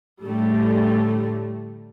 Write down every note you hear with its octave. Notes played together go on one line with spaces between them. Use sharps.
A2 D3 G3 A3